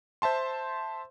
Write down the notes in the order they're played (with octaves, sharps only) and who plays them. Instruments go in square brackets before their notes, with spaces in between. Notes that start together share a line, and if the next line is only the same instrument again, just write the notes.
[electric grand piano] C5 E5 A5 C6